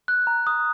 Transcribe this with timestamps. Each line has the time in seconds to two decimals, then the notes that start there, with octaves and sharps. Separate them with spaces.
0.08 F#6
0.27 A#5
0.47 D#6